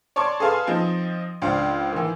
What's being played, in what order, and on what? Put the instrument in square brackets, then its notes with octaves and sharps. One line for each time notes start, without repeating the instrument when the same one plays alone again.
[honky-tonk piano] C#5 D5 A5 C6 D6
G#4 A4 B4 F5 A5 C6
F3 C4 D#4
C#2 D4 C5 F5
D#3 E3